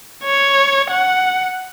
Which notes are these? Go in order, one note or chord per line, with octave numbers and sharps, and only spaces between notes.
C#5
F#5